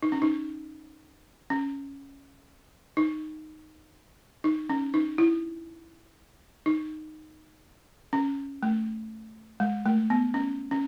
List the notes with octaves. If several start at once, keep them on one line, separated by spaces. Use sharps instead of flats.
D#4
C#4
D#4
C#4
D#4
D#4
C#4
D#4
E4
D#4
C#4
A3
G#3
A3
B3
C#4
C#4